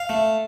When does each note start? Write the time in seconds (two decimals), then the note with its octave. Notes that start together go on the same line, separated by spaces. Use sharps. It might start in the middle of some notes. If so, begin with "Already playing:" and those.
Already playing: F5
0.09 A3